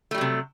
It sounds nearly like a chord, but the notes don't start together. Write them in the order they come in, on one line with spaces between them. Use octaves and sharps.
A3 G3 F#3 C3